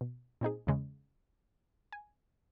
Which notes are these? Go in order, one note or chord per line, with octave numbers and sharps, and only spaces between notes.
B2
A#2 C4 D#4 G#4
E2 C#3 G#3
G#5